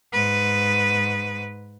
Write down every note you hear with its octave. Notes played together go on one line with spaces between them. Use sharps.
G#2 B4